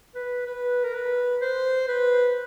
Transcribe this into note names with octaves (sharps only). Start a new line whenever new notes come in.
B4
B4
A#4
B4
C5
B4